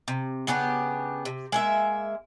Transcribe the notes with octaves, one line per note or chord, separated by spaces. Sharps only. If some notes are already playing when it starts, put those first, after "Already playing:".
C3
C#3 B3 D4 G4
C3
G#3 A#3 E5